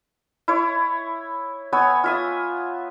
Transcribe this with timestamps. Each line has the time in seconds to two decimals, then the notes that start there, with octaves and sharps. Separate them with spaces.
0.48 E4 C#5
1.73 B3 C#5 G#5 E6
2.04 F4 E5 D#6